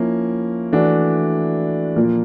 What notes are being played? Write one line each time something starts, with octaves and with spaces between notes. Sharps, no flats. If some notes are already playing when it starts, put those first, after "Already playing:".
Already playing: F3 A#3 C#4 E4
E3 A3 D4 F#4
A#2 F3 A#3